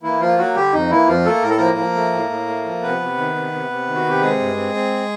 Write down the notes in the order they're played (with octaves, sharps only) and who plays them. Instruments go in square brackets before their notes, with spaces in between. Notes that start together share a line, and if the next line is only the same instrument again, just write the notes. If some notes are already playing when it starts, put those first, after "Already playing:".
[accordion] E3 A#3 E4
F3 A#3 F4
F#3 A#3 F#4
D3 G3 G4
F2 D#4
E3 A#3 E4
F2 F3 F4
A3 A#3 A4
A2 A#4
A4
F3 A#3 A#4
F3
A3
A2
A2
A3
F3
C3 B3 B4
C3
D#3
C3
C3
C3
D#3
F#4
C3 G4
G#3 C4 G#4
G2
C4
C4